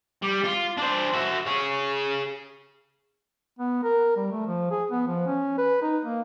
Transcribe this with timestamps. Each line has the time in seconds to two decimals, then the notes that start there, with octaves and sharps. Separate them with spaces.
0.22 G3
0.44 F4
0.78 D4 C5
1.13 F#4 E5
1.46 G#4 C#5
3.59 B3
3.84 A#4
4.16 G3
4.31 A3
4.47 F3
4.71 G#4
4.91 B3
5.07 F3
5.26 C#4
5.58 B4
5.82 D#4
6.05 A#3